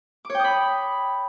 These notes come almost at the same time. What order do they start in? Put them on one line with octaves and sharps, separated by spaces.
D6 C#5 G5 D#6 B5